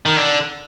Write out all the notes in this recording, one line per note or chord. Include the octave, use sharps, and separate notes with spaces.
D#3
D3